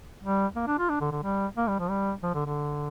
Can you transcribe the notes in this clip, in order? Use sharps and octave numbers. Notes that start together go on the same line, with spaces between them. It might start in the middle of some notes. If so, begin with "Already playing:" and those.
G3
A#3
D4
F4
D4
D3
D3
G3
A#3
G3
F3
G3
F3
D3
D3